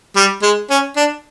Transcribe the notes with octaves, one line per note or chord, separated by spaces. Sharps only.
G3
G#3
C#4
D4